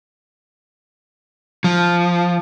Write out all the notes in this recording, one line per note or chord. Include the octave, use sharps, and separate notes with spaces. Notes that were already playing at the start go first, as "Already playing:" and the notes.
F3